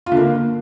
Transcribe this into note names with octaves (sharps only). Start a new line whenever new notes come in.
F4
D3
A#3